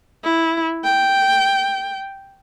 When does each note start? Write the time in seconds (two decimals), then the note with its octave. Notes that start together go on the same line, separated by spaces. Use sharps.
0.24 E4
0.84 G5